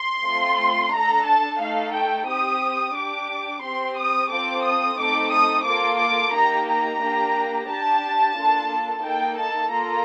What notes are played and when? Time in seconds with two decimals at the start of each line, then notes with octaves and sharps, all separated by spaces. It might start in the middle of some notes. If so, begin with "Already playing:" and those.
Already playing: C6
0.24 A3 C4 F4
0.92 D4 A4 A#5
1.25 A5
1.59 A3 D#4 A4 F5
1.93 G5
2.27 C4 G4 D#6
2.95 D4 G4 D6
3.62 C4 G4 C6
3.96 D#6
4.30 C4 F4 A4 D6
4.64 D#6
4.97 A3 C4 D#4 A4 D6
5.31 D#6
5.65 A#3 F4 A4 D6
5.98 D6
6.32 A#3 D#4 G4 A#5
6.67 A#5
7.00 A#3 D4 G4
7.68 D4 G4 A5
8.35 A#3 D4 F4 A4
9.03 A#3 D#4 A4 G5
9.37 A5
9.71 A#3 F4 A4 A#5